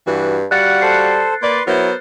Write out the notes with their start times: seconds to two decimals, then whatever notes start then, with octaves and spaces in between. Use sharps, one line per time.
0.07 G2 E3 F#4
0.51 G3 F#4 F5 F#5 F#6 A6 C#7
0.82 A4 C5 C7
1.42 A#3 B4 D5 C6
1.67 F#3 B3 E4 A#4 C5